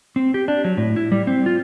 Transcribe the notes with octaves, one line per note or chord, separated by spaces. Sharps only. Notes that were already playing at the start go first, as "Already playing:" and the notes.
C4
G4
D4
F#3
A2
E4
G3
C4
F4